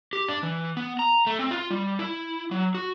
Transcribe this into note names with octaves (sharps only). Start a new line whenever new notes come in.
G4
D4
E3
B3
A#5
A3
C4
F4
G3
E4
F#3
F#4